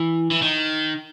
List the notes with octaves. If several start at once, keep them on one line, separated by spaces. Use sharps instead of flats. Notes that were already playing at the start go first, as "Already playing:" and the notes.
Already playing: E3
E3
D#3